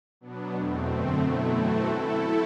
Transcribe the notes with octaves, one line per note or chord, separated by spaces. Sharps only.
B2 F#3 B3 D4
E2 B2 A3 C4
F#2 D3 A3 C4
B2 F#3 A3 E4
E3 A3 C4 F#4 A4
A3 E4 A4